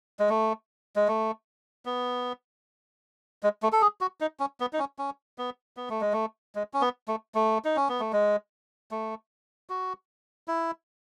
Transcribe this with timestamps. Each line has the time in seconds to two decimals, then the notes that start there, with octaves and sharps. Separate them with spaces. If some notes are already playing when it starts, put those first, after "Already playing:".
0.19 G#3
0.29 A3
0.96 G#3
1.08 A3
1.85 B3
3.43 G#3
3.63 A3
3.72 A4
3.82 G#4
4.01 F#4
4.21 D#4
4.40 C#4
4.60 B3
4.73 D#4
4.79 C#4
4.99 C#4
5.38 B3
5.77 B3
5.90 A3
6.01 G#3
6.13 A3
6.55 G#3
6.74 C#4
6.81 B3
7.08 A3
7.35 A3
7.65 D#4
7.76 C#4
7.89 B3
8.00 A3
8.13 G#3
8.91 A3
9.70 F#4
10.48 E4